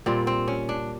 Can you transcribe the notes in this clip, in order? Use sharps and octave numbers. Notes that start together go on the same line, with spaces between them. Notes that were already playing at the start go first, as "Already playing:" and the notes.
A#2 G3 C4
C4
C#4
D4